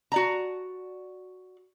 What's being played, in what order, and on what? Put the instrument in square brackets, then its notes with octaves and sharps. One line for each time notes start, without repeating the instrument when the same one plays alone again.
[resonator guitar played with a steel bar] F#4 D5 A#5